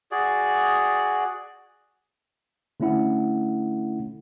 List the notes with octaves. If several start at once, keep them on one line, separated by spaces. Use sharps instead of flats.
F#4 G#4 D5
D3 A3 C#4 E4 F#5